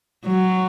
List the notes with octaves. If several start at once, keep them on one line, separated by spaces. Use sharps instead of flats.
F#3